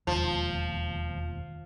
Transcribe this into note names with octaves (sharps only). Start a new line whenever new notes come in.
E1 D#2 F3